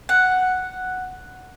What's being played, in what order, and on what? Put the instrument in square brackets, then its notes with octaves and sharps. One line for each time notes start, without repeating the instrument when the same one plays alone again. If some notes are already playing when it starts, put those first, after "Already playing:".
[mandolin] F#5